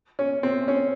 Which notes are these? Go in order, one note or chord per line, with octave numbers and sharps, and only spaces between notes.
C#4
C4
C#4